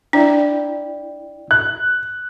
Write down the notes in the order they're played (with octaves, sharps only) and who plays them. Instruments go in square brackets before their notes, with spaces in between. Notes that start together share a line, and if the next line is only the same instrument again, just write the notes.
[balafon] D4 [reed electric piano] E4 D5 G5
[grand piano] F#6